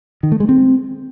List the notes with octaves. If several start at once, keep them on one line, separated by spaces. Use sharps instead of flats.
D#3
A3
G#3
C4